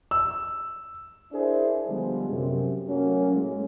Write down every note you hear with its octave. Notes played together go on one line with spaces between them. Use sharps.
E6
D4 E4 G#4 A#4 C5
D3 F3 G3 G#3 B3
F#2 C3
F#3 A3 A#3 C#4
A2 G#3